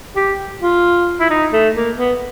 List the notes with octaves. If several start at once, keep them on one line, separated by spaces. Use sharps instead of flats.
G4
F4
E4
D#4
A3
A#3
B3